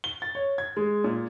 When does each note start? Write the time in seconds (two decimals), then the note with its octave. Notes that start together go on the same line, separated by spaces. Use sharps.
0.04 G7
0.22 A6
0.35 C#5
0.58 G#6
0.77 G#3
1.04 A#2